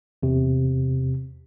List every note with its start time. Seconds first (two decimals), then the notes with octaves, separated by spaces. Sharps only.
0.23 E2 C3